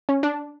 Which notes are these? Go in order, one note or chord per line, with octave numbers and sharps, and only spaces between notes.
C#4
D4